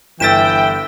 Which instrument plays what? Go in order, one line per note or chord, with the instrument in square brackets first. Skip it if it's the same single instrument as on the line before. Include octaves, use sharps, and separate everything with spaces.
[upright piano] G1 A6 [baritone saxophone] E3 [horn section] G5 [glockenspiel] E6 B6 E7